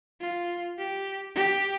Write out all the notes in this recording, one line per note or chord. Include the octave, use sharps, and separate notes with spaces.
F4
G4
G4